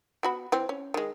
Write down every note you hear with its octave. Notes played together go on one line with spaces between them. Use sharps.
B3 F#4 B5
E3 C4
C#4
D#3 G#3